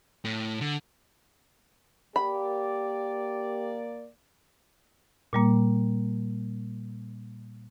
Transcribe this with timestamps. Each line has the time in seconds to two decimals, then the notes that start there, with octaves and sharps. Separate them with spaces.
0.25 A2
0.61 D3
2.16 A#3 G4 D5 B5
5.33 A#2 G3 A#3